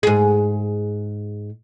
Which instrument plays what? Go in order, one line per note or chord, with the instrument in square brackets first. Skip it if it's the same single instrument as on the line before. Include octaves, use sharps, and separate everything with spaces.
[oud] G#2 G#4